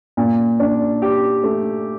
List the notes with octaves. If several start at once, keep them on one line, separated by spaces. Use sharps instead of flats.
A#2
D4
G4
A3